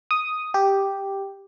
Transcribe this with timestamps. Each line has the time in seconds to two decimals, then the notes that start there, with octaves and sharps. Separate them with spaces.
0.11 D#6
0.54 G4